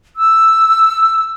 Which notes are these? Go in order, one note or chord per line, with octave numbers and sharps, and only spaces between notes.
E6